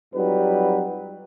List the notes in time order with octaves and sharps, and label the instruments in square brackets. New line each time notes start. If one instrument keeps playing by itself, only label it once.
[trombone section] F2 F#3 G3 D#4 B4